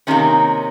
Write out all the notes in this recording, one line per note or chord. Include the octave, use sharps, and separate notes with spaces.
C3 D#3 A#3 C#4